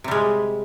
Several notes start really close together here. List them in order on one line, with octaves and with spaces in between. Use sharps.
C3 G3 G#3